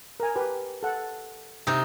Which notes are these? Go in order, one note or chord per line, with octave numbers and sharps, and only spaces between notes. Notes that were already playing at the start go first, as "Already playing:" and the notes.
A#4 G#5
G4 B4
A4 F#5
C3 D#4